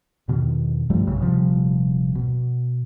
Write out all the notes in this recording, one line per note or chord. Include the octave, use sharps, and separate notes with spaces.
E2 B2 D#3
G2 F3 G3 A3
B1 G2 C#3
D#1 C3 F3 G3
B2